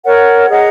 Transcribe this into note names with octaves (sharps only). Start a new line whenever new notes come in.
A#4 C#5 F#5
G#4 D#5 F#5 A#5